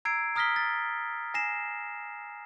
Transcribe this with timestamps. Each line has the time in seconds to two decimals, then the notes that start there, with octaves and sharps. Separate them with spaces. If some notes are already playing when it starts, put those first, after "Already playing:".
0.05 A#5 E6 G#6 C7 D7
0.36 A#5 D#6 F6 A#6 B6 G7
0.56 A6
1.34 G#5 A#6 C7 E7